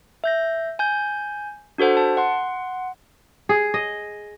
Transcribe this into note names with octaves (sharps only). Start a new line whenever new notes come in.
E5 G6 A#6
G#5 G6
D4 F#4 A4 C5 F#5
A5
F#5 C6
G#4
D#5